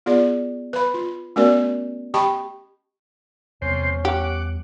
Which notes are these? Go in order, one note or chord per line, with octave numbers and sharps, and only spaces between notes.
B3 F4 G#4 D5
B4 B5
F4
A3 B3 C#4 F#4 A#4 D5
G4 D#5 G5 A5 B5 C#6
E2 C3 G3 B3 C#4 C5
G4 F#5 D6